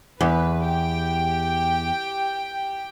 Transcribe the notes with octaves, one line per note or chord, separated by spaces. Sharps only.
E2 B4
G4 G5